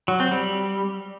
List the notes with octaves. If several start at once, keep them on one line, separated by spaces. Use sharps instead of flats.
F#3
C4
G3